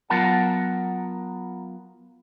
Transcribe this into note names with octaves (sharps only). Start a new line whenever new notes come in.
F#3 B3 F4 A#4 F#5 A5